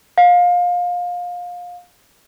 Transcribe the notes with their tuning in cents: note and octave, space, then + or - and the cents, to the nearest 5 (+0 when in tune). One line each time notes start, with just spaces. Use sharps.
F5 +25